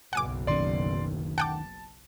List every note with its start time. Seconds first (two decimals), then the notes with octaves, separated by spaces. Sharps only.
0.13 F#1 B1 F#5 G#5 D6
0.47 D2 D#3 C#4 D5 C6
1.38 F#5 G5 A5 D6